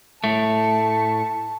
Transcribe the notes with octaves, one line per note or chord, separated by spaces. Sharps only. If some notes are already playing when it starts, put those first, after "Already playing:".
A2 A3 A5